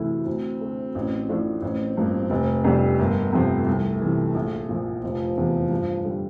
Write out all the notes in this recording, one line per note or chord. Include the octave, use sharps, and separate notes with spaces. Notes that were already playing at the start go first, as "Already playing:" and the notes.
Already playing: D2 C3 E3 A3 E4
D2 C4
D3 A3
A1
A2 F3 A3 D4
A1 C4
G2 F3 A#3
F1
F2 C3 G3 D4
G1 A#3
F2 C3 F3 A3 C4
C2
C3 E3
A#1
A#2 F3
F1 F3
E2 C3 E3
G2
D3 G3